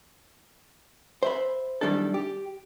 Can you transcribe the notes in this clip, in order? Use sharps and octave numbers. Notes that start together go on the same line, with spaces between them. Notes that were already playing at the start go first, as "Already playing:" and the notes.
C5 E5 B5
B1 D#3 G3 D4 E4 A4
G4